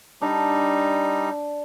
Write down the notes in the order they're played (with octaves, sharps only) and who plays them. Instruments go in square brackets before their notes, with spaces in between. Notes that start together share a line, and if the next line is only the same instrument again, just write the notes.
[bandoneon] G3 D#4 [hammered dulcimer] D4